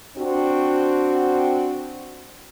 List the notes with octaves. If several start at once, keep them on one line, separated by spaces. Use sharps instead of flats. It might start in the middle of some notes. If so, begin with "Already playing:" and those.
C4 D4 F#4